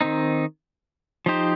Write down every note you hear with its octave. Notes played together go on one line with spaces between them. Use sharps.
D#3 C4 D#4
F3 D#4 G4 C5